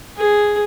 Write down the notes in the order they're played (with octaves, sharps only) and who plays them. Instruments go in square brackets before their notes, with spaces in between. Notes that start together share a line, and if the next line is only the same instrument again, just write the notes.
[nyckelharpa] G#4